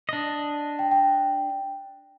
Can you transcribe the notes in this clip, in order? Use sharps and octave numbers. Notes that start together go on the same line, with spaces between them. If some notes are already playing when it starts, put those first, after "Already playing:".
D4 D#5
G5
G5